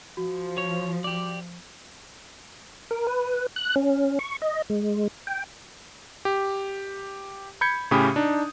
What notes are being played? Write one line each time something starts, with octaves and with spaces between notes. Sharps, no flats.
F3 F#4
C#5
G4 D5
A#4
B4
F#6
C#4
C#6
D#5
G#3
G5
G4
B5 G6 G#6 C#7
A2 C#3 C#4 G4 B5 D#6
D4 D#4